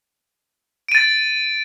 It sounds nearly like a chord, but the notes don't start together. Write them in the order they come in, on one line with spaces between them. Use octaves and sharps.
D7 D#7 A6